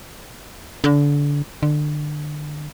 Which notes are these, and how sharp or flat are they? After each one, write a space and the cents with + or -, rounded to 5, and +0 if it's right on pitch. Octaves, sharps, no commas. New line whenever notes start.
D3 -25
D3 +25